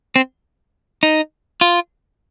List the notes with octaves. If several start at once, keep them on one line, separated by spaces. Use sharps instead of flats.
C4
D#4
F4